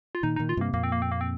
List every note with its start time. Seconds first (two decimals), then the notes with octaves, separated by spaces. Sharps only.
0.15 F4
0.23 A#2 D#3 D#4
0.36 D#4
0.39 A#2 D#3
0.49 F4
0.57 G2 C3 A#3
0.73 F2 A#2 A#3
0.83 C4
0.92 A#3
1.02 C4
1.12 A#3
1.21 C4